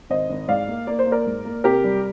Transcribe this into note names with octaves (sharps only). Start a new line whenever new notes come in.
G#1 C5 D#5
G#1
G#2 D5 F5
A#3
A#3 D5
C5
A#3
A#4 D5
G#2
A#3
C3 G4 A#4
G3